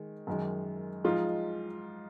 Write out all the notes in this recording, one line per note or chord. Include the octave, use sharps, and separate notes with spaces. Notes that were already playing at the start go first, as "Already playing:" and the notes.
Already playing: D#3 G#3
F#2 D#3 G#3
G#2 F3 G#3 D#4 F4